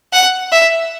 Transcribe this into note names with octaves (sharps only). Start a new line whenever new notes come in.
F#5
E5